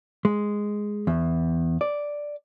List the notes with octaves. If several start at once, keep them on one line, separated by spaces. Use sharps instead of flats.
G#3
E2
D5